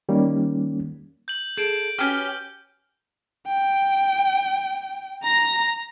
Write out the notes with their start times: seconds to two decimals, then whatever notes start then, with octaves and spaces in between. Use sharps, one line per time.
0.09 D#3 G3 A#3 C#4
1.28 G6 F#7
1.57 G#4 A4 G6 D7
1.99 C#4 F#4 G4 B4 G5 F6
3.48 G5
5.23 A#5 A#6